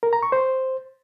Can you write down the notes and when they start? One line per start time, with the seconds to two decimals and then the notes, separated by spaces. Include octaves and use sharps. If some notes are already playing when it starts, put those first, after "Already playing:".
0.03 A#4
0.13 A#5
0.23 C#6
0.32 C5